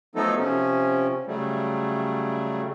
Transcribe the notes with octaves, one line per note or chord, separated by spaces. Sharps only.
F3 F#3 A3 B3 D#4 A4
C3 F3 C#4
C#3 F#3 G3 A3